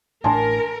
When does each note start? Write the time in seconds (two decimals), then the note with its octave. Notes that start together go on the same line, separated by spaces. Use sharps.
0.24 A1 A2 D4 A#4 G#5 A5 C6